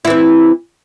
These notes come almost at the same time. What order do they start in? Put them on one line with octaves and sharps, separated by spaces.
E4 E3 C4